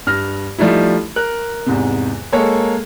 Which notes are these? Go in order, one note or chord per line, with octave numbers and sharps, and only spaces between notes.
G2 F6 A#6
F3 G3 A3 D#4 E4
A#4 F#6
E2 G#2 C3
G#3 A#3 A4 C#5